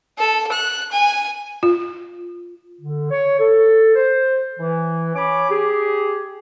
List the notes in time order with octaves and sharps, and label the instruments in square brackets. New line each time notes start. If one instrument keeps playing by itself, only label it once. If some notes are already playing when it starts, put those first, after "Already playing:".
[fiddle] A4
F#6
G#5
[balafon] F4
[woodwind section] D3
C#5
A4
C5
E3
C#4 C#5 B5 D6
G4 G#4